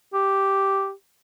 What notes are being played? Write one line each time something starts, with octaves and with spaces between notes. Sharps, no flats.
G4